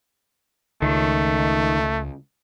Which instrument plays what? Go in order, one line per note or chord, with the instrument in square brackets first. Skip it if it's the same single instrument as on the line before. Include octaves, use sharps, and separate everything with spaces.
[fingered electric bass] C#2 [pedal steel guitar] D#3 [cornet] A3